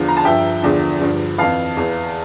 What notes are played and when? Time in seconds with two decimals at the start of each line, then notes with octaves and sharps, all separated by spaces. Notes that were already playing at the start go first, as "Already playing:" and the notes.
Already playing: E2 D3 F3 F5
0.08 A#5
0.17 A5
0.24 G2 F3 E5 G5
0.63 E2 D3 F3
1.00 G2 D3 F3
1.38 F2 E3 F5 A5
1.77 E2 E3